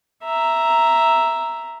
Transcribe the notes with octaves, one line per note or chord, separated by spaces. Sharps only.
E5 A#5